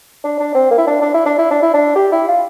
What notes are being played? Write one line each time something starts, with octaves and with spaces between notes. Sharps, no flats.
D4
D4
C4
A#3
E4
D4
D4
E4
D4
E4
D4
E4
D4
G4
E4
F4